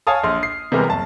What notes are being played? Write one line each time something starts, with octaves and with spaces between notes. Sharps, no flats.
C#5 F5 G#5 A5 D#6 F6
A#1 C6 F6
C7
C3 E3 G3 G#3 B3 A#4
F#1 A5